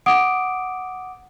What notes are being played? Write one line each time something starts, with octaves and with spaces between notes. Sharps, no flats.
F#5 D6 D#6 D7